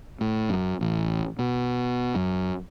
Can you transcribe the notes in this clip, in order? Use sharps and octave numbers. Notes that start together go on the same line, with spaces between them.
A2
F#2
A1
B2
F#2